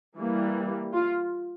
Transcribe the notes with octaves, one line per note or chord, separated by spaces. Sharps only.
E3 G3 A#3
F4